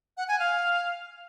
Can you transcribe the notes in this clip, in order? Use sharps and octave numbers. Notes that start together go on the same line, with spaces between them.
F#5
G#5
F5